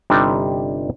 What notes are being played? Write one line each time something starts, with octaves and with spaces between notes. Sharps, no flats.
G1 C3 G3 D4 D#4 G5